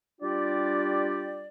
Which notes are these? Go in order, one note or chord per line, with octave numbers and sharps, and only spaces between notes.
G3 D4 F4 G4 D5